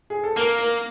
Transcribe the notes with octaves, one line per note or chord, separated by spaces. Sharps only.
G#4
A4
A#3 A#4
A#4